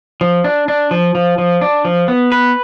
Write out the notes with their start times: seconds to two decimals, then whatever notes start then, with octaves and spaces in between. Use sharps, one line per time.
0.21 F3
0.44 D4
0.68 D4
0.91 F3
1.15 F3
1.38 F3
1.61 D4
1.85 F3
2.08 B3
2.32 B4